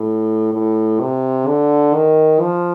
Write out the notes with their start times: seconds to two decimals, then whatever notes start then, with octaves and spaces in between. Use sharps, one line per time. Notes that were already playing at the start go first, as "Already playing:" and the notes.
Already playing: A2
0.54 A2
1.01 C3
1.47 D3
1.94 D#3
2.41 F3